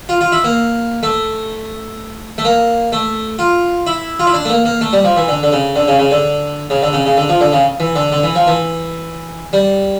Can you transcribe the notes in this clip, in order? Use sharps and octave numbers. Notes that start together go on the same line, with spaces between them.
F4
F4
E4
A#3
A3
A3
A#3
A3
F4
E4
F4
E4
D4
A3
A#3
A#3
A3
G3
F3
E3
D3
D3
C#3
D3
C#3
C#3
D3
C#3
D3
C#3
C#3
D3
F3
D3
C#3
E3
D3
D3
E3
F3
E3
G3